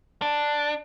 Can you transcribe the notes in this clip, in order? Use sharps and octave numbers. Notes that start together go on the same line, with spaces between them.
D4